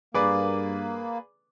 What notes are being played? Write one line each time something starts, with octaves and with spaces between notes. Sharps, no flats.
G2 A#3 G#4 B4 D5 D6